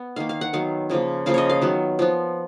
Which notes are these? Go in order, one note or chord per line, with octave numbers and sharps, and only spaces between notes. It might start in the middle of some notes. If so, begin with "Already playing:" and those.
Already playing: B3
D#3 A#3 F5
F5
F#5
D#3 F#3 B3 F5
C#3 F3 A#3
C#3 F3 A#3 F5
C#5 D#5
F5
D#3 F#3 B3
F3 B3